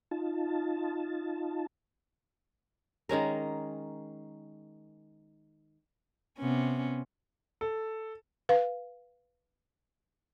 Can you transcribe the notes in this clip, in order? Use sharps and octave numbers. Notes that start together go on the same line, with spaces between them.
D#4 F4 A5
D#3 G#3 C#4 A#4
C3 B3 C#4
A4
B4 F5